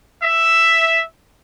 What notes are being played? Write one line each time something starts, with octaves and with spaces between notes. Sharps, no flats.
E5